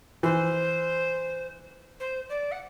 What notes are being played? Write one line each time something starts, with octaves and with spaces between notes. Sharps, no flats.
E3 C5
C5
D5
F#5